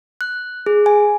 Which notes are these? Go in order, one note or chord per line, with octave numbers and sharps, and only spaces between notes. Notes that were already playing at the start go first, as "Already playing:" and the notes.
F#6
G#4
G#5